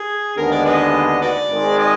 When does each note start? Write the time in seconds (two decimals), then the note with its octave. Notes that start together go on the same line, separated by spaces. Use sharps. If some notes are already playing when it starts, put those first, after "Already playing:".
Already playing: G#4
0.37 D#2 D3 G#3 B3 D4 A#4
0.51 D5
0.66 G#4 B4 D#5
1.22 F#4 B4 D5
1.51 G#1 G#2 D#3 G#3
1.79 D#5